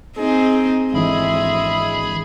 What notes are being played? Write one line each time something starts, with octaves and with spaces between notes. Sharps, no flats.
C4 D#4 G#4
G#1 D3 E3 G#3 G#4 E5 B5